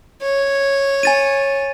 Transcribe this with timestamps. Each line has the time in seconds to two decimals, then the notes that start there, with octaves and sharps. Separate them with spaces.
0.22 C#5
1.03 G#5 A6 D#7